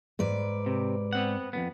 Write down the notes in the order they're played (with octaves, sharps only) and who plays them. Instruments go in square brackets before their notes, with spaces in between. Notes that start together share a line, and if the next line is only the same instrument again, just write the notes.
[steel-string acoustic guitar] G#2 B4 D5
[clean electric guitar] C3
B3 C4 F#5
F2 G#2 B3